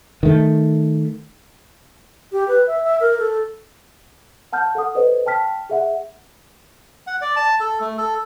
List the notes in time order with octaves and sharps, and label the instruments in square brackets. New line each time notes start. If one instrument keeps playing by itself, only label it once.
[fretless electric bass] D#3 A3
[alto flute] G4
B4
E5
E5
A#4
A4
[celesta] F#5 A5 F6 G6
A4 F#5 D#6
A4 B4 C5 D5 D#5
G5 A5 F6 B6
G#4 E5 F#5
[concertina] F#5
D5
A5
A4
A3
A4